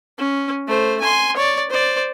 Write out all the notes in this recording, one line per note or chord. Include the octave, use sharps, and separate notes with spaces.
C#4
A3 C5
G#5 C6
C#5 D5
C5 D5